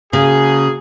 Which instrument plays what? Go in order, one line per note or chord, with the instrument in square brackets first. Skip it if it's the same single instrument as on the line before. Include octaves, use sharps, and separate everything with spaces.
[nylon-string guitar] C#3 [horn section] A#3 F#4 G#4